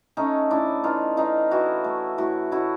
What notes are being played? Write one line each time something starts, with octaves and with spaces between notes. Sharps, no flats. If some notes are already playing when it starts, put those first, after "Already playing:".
A3 C#4 D#4
A2 D4 E4
E3 D#4 F4
E3 D#4 F4
E3 E4 F#4
A3
A2 E4 F#4
A2 E4 F#4